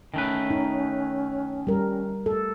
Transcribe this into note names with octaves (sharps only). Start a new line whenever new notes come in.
D#3 A3 C#4 B4
D#4
G3 A#4
A4